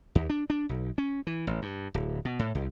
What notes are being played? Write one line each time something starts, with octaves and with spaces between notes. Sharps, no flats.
D#2
D4
D4
B1
C#4
E3
A1
G2
D1
B2
A2
C2